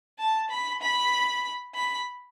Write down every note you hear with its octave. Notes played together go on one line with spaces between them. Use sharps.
A5
B5
B5
B5